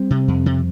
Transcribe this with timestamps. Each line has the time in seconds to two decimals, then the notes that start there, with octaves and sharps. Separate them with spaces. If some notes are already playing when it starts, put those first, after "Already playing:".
Already playing: G3 C4
0.11 C3
0.28 F2
0.46 C3